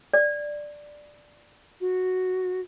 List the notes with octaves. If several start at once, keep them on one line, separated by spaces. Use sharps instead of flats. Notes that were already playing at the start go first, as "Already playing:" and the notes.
D5
F#4